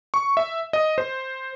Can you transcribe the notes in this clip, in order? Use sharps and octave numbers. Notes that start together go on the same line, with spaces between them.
C#6
E5
D#5
C5